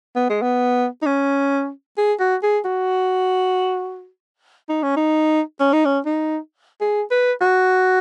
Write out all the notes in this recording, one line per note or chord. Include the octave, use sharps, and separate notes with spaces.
B3
G#3
B3
D#4
C#4
G#4
F#4
G#4
F#4
D#4
C#4
D#4
C#4
D#4
C#4
D#4
G#4
B4
F#4